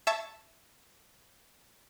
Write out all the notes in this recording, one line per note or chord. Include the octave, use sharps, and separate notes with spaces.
E5 A5 C#6 G#6 A6 B6